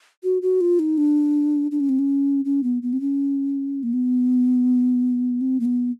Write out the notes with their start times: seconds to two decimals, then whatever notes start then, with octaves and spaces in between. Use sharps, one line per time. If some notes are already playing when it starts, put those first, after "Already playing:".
0.23 F#4
0.42 F#4
0.61 F4
0.79 D#4
0.98 D4
1.71 D4
1.80 C#4
1.89 C4
1.99 C#4
2.45 C#4
2.63 B3
2.82 B3
2.93 C4
3.01 C#4
3.83 A#3
3.93 B3
5.41 C4
5.60 A#3
5.65 B3